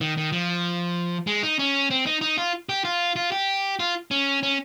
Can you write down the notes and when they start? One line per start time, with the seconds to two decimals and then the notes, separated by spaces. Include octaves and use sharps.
0.01 D#3
0.17 D#3
0.32 F3
1.27 G#3
1.43 D#4
1.59 C#4
1.91 C4
2.06 D#4
2.21 D#4
2.38 F4
2.69 G4
2.84 F4
3.16 F4
3.32 G4
3.80 F4
4.11 C#4
4.43 C#4